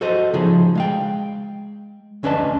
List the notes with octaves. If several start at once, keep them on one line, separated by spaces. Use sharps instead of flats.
F#4 A4 C5 D#5
C#3 F3 D#4 G#4
G#3 F5 G5
D2 C#4 D4 B4 D#5 A5